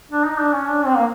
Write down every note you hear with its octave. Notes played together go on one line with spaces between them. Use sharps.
D4
D#4
D4
C#4
D4
C4
A#3